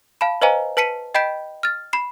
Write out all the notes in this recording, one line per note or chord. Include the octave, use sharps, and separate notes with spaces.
F5 A5 B5
B4 C5 D#5 F5 G#5 A#5
B4 A5 B6 C#7 D#7
D#5 G5 B5 G6 B6 D7
F6 A6
B5 C7